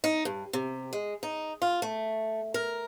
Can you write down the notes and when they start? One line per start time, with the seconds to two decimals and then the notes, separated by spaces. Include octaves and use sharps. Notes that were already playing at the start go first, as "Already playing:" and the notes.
0.04 D#4
0.25 G2
0.53 C3
0.93 G#3
1.23 D#4
1.62 F4
1.82 A3
2.54 A#4